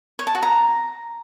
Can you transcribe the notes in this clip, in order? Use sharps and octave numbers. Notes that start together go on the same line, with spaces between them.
C#5
A5
F#4
A#5